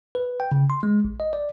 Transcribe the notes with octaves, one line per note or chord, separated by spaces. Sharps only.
B4
G5
C#3
C6
G#3
A1
D#5
D5